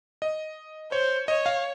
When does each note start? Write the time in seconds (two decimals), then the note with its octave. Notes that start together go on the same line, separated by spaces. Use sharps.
0.22 D#5
0.92 C5 C#5
1.28 C#5 D#5
1.46 F5